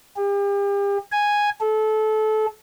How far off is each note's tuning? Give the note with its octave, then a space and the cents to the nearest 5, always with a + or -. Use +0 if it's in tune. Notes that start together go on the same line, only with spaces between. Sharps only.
G4 +40
G#5 -5
A4 -25